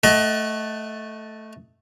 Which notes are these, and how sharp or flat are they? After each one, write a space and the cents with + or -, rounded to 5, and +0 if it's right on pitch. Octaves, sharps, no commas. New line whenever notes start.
A3 +0 D#5 +20 F#5 +25